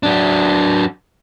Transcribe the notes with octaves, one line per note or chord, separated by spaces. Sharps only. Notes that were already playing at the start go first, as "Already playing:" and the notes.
F#3 D4